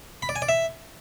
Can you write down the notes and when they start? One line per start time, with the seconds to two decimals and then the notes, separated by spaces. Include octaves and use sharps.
0.22 B5
0.29 D5
0.36 G#5
0.42 D5
0.49 E5